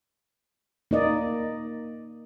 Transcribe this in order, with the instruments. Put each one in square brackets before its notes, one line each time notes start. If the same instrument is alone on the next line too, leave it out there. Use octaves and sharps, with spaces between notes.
[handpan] A#3 D#4 D5 D#5